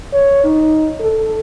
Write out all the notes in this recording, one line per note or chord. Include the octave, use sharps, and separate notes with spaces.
C#5
D#4
A4